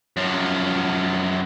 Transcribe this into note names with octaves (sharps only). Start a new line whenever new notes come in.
F#2 F3